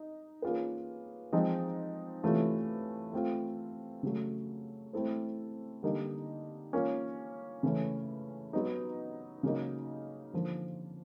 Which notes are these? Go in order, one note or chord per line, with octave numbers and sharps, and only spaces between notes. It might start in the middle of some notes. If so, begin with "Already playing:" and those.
Already playing: D#4
A#3 C#4 F4 G#4 B4
F3 G#3 C4 D#4
C3 E3 A3 C#4 F4
A3 C4 F4
C#3 F#3 A3
A3 C4 E4 A4 C5
D3 G3 A#3 D#4
A#3 C#4 F4
C#3 E3 A3 C#4
F#3 B3 D#4
C#3 F#3 A#3 D#4
D3 F3 A#3